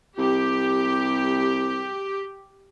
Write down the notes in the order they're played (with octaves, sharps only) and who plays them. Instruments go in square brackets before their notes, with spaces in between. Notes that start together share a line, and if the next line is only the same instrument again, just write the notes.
[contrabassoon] C2 [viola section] G4